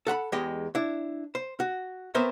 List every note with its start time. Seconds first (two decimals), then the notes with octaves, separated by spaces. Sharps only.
0.07 A4 F#5 A#5 B5
0.32 E2 G#3 G4 D#5
0.75 D4 E4
1.35 C5
1.60 F#4
2.15 B3 C4 A#4 C5 C#5 E5